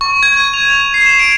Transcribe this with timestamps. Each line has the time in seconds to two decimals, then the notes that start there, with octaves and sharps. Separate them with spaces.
0.01 C#6
0.23 G#6
0.37 D#7
0.54 F7
0.94 C7
1.06 E7
1.19 D7